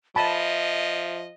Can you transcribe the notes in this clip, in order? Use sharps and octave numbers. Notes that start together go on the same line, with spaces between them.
F3 D#5 E5 G#5 A5 B5